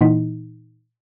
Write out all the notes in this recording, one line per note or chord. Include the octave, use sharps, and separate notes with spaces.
A#2 E3 D#4